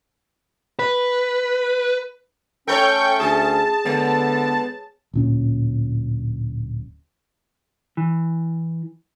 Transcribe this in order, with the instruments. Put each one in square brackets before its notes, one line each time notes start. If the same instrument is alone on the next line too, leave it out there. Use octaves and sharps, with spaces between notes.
[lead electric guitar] B4
[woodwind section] A3 C#4 [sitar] A4 A#4 C#5 [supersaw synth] G5 C#6 G6
[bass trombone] D2 [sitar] G#4 [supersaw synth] A5
[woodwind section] D3 [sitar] G#3 [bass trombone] B3
[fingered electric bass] D1 A#2 C#4
[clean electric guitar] E3